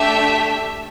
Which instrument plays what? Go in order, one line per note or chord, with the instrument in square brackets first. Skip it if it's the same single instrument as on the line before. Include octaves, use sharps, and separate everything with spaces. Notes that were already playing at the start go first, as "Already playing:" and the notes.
Already playing: [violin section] A3 D4 G4 E5